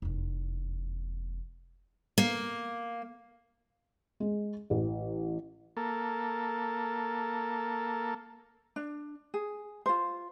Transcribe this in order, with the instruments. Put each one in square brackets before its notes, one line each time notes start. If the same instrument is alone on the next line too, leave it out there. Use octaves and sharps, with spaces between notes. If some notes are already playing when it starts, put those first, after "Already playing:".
[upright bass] F1 E2
[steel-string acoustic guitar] A#3
[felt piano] G#3
A1
[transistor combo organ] A#3 A4
[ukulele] D4
G#4
F4 C5